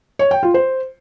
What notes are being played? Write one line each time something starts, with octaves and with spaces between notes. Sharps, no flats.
C#5
G5
F4
C5